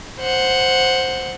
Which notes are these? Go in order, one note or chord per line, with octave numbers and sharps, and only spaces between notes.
C5 F#5